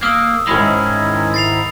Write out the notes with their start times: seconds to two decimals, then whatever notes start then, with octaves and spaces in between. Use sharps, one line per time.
0.03 A#3 D#6 E6
0.47 G#2 D#3 G#3 C#4 E4 B5
1.34 A6 C7 F7